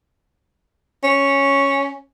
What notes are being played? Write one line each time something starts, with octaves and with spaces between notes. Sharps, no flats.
C#4